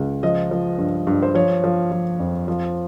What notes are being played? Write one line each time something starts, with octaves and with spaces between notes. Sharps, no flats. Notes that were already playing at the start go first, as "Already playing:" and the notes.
Already playing: C#2
F3 D#5
F3
G2
G2
C5
F3 C#5
F3
F3
F2
F3